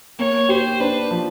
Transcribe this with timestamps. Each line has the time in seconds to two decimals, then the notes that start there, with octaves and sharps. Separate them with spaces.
0.19 A#3 C#5
0.49 G4 C5
0.80 D4 B4
1.11 F3